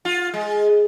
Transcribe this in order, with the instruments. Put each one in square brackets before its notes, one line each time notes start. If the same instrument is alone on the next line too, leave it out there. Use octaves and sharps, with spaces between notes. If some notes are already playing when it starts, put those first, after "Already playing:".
[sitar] F4
G#3